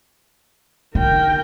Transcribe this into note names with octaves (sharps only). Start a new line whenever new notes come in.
D3 D#4 A#4 G5